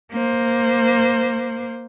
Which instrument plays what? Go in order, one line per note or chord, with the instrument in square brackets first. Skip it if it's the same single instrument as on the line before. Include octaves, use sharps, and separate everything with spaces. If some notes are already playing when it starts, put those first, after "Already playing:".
[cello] A#3 C5